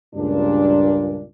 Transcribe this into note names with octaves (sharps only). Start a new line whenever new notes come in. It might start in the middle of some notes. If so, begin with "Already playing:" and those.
C#2 G2 A#2 D4